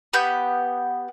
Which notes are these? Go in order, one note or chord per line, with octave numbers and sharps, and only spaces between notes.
B3 G4 F#5 G6